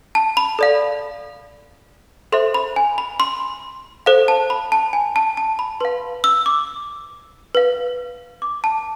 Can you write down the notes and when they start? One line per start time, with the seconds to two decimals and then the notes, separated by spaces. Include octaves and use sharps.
0.15 A5
0.37 B5
0.59 A4 D5 F5
2.32 A4 C5 E5 C6
2.54 B5
2.76 G#5
2.98 B5
3.20 C6
4.06 A4 C5 F5
4.28 A5
4.50 B5
4.72 A5
4.93 G#5
5.16 A5
5.37 A5
5.59 B5
5.80 B4 F5 C6
6.24 E6
6.46 D6
7.55 B4 F5
8.42 D6
8.64 A5